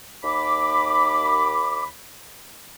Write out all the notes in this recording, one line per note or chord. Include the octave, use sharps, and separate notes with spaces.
D#2 B5 D6